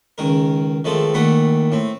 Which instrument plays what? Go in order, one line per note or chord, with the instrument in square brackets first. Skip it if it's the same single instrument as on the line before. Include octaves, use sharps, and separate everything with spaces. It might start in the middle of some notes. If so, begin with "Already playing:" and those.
[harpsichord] C#2 D#3 A#4
D#3 F3 G#3 A3 C4
A#1 D#3 A3 F#5 B5
A2 C4